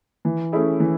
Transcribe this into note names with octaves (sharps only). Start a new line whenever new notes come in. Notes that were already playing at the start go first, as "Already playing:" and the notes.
E3
A3 C#4 E4 G#4
E3